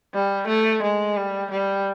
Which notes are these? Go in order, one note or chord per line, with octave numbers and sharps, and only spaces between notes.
G3
A3
G#3
G3
G3